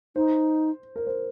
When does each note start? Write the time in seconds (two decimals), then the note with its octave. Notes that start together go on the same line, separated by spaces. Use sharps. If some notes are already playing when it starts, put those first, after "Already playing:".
0.16 D#4 C5
0.96 A#4
1.07 C5